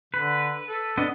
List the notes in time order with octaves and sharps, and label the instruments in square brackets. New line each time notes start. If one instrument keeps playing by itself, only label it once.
[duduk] D3 [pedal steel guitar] B4
[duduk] A4
[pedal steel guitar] B3 D4 D#5